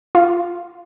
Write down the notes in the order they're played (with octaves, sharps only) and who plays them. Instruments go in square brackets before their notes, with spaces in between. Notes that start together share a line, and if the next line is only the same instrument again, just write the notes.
[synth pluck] F4